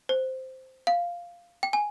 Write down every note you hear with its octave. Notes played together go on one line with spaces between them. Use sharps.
C5
F5
G5
G#5